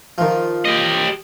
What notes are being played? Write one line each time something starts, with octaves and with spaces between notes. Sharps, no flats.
D#3 F3
G4 D#5